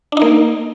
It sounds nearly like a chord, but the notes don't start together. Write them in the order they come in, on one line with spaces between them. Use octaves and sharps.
D4 D#4 A#3